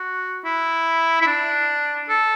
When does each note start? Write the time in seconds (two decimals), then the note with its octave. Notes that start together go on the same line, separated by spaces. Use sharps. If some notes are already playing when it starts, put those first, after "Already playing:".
Already playing: F#4
0.45 E4
1.22 E4
1.27 D4
2.09 A4